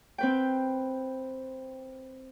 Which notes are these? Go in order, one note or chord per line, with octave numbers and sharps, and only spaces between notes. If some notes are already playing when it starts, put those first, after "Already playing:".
C4 B4 G5